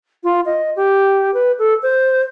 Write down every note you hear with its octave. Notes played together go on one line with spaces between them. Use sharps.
F4
D#5
G4
B4
A4
C5